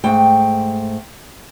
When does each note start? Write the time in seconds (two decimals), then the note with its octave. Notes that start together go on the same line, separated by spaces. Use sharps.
0.04 G#2 A3 G5